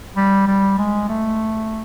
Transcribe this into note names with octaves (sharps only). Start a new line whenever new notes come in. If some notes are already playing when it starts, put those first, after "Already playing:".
G3
G3
G#3
A3